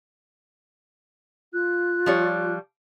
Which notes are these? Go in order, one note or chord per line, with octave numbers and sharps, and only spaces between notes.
F4 F#6
F3 G3 C#5